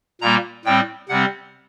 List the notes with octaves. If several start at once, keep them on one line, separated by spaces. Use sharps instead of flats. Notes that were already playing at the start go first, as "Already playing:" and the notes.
A#2 G3 A#3 A#5
A2 G3 C4 G5
C3 G3 C4 F#5